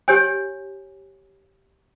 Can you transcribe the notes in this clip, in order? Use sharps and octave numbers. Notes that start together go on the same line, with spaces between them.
G4 C#5 G#5